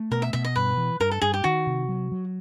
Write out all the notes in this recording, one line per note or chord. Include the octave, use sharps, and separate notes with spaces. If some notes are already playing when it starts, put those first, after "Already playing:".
Already playing: A3
B2 A#4
E5
B2 E5
D#5
G2 B4
E3
G2 A#4
A4
G2 G#4
G4
D#3 F#4
C3
F#3
F#3